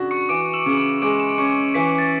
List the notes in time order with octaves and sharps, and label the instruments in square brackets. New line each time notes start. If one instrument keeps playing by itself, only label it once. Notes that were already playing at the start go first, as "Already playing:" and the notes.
Already playing: [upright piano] C#3 D4 F#4
[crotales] C#6 C#7
[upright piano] E3 [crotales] D6 D7
[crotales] E6 E7
[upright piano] C#3
[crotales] D6 D7
[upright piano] G#3 [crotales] D6 D7
[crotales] E7
D7
[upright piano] C#4 [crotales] C#6 C#7
[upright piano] E3 [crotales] B6
[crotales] A6